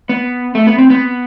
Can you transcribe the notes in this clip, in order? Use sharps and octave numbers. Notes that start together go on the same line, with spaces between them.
B3
A3
B3
C4
B3